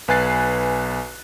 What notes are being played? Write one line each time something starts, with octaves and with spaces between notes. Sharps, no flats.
B1 B4 G#5 F#6 A6 C7